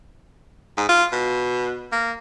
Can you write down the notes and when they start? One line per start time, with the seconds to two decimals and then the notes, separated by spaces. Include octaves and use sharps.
0.77 G#2
0.89 F4
1.12 B2
1.92 A#3